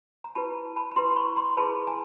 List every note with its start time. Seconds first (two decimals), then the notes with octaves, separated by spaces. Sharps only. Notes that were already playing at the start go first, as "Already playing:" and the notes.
0.24 A#5
0.35 E4 G4 B4 A5 B5
0.76 A5 B5
0.91 B5
0.96 E4 G4 B4 A#5 C6
1.16 B5 C#6
1.36 A#5 C6
1.57 E4 G#4 B4 A5 B5
1.87 G#5 A#5